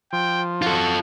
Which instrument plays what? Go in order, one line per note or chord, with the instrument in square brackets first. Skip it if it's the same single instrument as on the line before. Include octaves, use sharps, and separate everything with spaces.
[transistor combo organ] F3 [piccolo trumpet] G5
[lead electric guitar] F4 A4 [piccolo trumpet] F#4